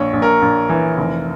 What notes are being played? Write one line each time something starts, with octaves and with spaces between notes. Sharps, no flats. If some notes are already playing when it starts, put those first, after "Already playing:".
Already playing: A#1 C#5
A#1
A#4
A#1
E3
F1